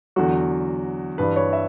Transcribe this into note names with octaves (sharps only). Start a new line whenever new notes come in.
E2 D3 F#3 F#4
G2 E3 G3 B4
C#5
E5